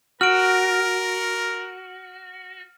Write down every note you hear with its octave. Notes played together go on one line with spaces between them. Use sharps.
F#4 A#4 F6 D7